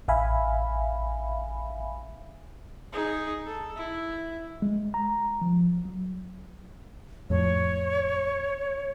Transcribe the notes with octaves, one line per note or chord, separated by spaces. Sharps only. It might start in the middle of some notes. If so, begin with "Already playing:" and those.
A1 E5 F5 G#5 B5
D#4 G#4
A4
E4
G#3
A#5
F3
F#3
F2 A2 C#5